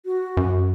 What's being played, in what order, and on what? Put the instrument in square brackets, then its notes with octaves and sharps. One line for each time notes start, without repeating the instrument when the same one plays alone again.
[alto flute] F#4
[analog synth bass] F#2